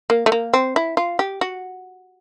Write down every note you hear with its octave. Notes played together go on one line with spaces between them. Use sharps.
A#3
A3
A#3
C4
E4
F4
G4
F#4